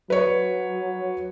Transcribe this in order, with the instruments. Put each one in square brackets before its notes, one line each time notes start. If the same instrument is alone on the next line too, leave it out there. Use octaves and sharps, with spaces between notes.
[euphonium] F#3 [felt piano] B4 C#5